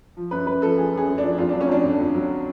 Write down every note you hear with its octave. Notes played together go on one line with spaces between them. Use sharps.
F3
F#2 B4
F#2 B4
F3 A4
F3 G#4
F#2
G#4
F#2
D4
F3
F2 F4
F#3 D4
C#4
F2 D4
D3
F2
F#3